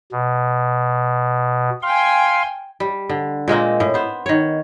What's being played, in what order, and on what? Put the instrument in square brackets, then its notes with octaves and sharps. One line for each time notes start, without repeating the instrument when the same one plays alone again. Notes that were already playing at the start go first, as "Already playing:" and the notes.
[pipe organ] B2
[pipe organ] F5 C6 [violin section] G5 G#5
[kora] G3
D3
A#2 G#3 A#3 C4
A2
B3 C5
D#3 C#5